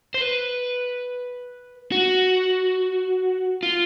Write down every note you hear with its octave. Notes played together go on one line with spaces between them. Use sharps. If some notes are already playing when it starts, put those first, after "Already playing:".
C5
B4
F#4
F4